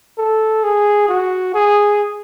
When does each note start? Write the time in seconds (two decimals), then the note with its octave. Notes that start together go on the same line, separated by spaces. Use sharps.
0.18 A4
0.64 G#4
1.09 F#4
1.54 G#4